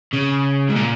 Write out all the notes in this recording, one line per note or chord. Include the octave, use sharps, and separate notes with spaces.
C#3
G#2
A#2